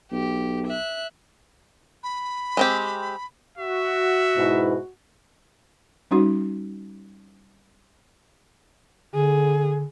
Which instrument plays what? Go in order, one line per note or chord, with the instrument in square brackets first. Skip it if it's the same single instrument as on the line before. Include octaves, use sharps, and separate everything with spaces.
[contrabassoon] B1 [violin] G4
[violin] E5 F#6
[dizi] B5
[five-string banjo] G#3 C4 G4
[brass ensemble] F#4 [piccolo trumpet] E5
[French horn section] G#2 B2 E4
[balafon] G3 C#4 D#4 F#4
[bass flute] D3 [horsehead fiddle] G#4